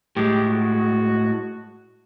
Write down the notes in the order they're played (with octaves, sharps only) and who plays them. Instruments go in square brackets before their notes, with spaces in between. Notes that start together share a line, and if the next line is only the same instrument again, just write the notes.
[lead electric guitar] A2 G#3 [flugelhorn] G4
[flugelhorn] F#4